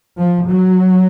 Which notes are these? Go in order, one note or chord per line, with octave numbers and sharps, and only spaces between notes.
F3
F#3